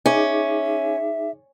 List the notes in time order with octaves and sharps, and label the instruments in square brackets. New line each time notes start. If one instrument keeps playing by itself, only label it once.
[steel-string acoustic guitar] C#4 [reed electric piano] D#4 G#4 D6 [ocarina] E5